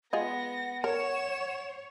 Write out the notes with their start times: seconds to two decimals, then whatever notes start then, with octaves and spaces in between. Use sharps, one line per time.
0.13 G#3 B3 F4 D#5 F#5 A#6
0.84 A#4 C#5 E7